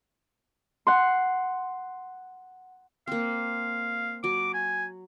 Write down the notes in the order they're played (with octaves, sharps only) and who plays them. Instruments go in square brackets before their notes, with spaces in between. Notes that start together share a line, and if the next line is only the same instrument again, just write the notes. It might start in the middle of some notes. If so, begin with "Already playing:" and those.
[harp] F#5 C6
[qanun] A#3 C4 [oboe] F5
[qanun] F#3 [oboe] D6
[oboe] G#5